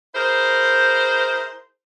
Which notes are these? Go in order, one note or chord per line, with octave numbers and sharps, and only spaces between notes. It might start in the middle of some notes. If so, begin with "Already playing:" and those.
E4 G#4 A#4 C5